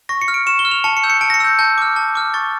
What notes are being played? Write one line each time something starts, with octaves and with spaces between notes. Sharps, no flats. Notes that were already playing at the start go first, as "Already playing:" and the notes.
C#6 A#6
C#7
F6
D7
C#6 E7
G7
F6
F7
A5 C#7
C#7
E6 G6
C#7
A5 D7
A#6
C#7
E6 G6
A5 G6
D6 F6
A5
D6 F6
C#6 A6